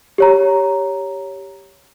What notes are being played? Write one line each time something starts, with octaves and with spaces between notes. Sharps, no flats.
G4 C#5 A#5